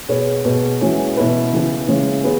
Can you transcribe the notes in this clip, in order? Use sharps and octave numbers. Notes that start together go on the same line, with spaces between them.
B2 B3 G#4 C#5
B2 B3 G#4 B4
E3 G#3 C#4 F#4
B2 B3 E4 B4
C#3 E3 B3
C#3 E3 G#3 C#4
B3 G#4